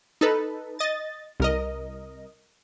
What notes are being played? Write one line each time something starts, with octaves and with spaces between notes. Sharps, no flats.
D#4 A4 B4
D#5 A6
C2 A#4 D#5